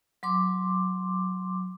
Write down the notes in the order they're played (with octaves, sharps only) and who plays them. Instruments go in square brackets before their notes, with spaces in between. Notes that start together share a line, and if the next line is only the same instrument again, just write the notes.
[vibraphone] F#3 C6 D6